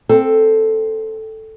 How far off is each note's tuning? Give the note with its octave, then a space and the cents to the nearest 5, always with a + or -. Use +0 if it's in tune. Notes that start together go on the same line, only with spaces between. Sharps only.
C4 +0 A4 +0